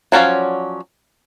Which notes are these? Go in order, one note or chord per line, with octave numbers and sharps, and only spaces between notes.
F3 F#3 C#4 D5 F5